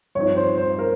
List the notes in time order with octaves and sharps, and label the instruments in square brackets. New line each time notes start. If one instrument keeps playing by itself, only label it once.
[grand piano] G2 F3 C4 D#4 [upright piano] C#5
[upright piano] C5
C5
A#4